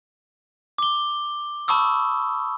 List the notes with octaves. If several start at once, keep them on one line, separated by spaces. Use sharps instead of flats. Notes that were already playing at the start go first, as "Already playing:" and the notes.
D6 G7
A5 B5 C#6 D#6 E6